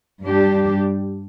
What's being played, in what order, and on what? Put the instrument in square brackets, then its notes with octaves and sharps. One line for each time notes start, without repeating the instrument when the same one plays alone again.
[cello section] G2 G3 D4 G4